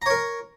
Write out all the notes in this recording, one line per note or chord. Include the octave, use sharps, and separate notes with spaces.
A#4 C#5 A#5